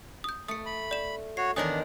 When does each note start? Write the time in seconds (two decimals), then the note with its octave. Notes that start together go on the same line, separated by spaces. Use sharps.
0.24 D#6 G6
0.48 A3 D#6 C#7
0.66 B5
0.91 D5 E7
1.37 F#4 C#5 C7
1.56 E2 D#3 D4 A#4 C#5 G#5 D#6